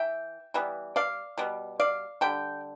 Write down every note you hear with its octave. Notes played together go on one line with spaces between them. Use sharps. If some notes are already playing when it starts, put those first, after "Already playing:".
Already playing: E3 E5 G5
E3 G3 B3
D5 F5
B2 G3 B3
D5 F5
D3 G3 G5